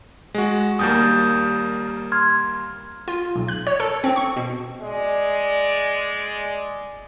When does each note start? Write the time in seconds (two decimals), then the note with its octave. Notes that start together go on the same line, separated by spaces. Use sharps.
0.34 G#3 F#4
0.79 D#2 G3 A#3 D#6 G6 A6
2.12 C6 F6 G#6
3.08 F4
3.35 B1
3.48 F#6
3.67 C#5
3.80 A4
4.04 C4
4.16 C#6
4.36 B2
4.81 G#3 D5